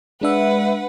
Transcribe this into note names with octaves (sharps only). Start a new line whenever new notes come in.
G#3 D4 B4 E5 F#5